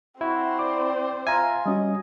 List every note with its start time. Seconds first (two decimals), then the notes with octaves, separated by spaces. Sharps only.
0.21 C4 E4 F#4 C5
0.59 D5 D6
1.27 F4 E5 G#5 A#5
1.66 G3 C#4 F#4 D#5